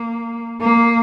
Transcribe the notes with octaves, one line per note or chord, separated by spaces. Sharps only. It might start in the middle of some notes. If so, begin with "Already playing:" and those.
Already playing: A#3
A#3